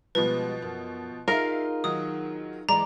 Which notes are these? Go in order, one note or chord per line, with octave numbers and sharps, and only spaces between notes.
B2 F3 G3 G#3 B4
F#2
D#4 F4 G#4 A#4 E5 F5
D#3 F#3 D#6
E3 G#3 D5 A#5